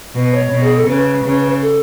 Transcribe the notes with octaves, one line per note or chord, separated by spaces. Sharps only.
B2 B4
C#5
B2
G#4
A4
C#3 B4
C#3
A4